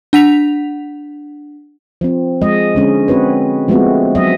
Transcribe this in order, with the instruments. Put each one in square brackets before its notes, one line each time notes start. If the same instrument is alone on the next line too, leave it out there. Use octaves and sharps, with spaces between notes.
[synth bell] D4 F#5 B6 F7
[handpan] F3 C4
F3 G#3 D#5
D3 G#3 C#4
C4 F#4 B4 C#5
F3 G#3 A3 B3 C4 F#4
F#3 D#5 E5